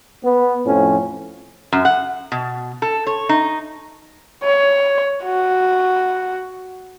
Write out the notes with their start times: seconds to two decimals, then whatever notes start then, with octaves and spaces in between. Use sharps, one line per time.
0.25 B3
0.66 F2 A2 F3 C#4
1.72 F#2
1.85 F#5
2.32 B2
2.82 A4
3.07 C#5
3.29 D#4
4.43 C#5
5.23 F#4